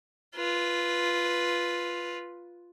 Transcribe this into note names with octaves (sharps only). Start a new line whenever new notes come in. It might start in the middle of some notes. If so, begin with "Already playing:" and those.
F4 B4